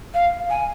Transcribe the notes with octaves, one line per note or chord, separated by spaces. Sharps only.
F5
G#5